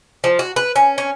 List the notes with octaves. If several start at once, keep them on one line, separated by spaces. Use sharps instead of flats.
F3
F#4
B4
C#4
C#4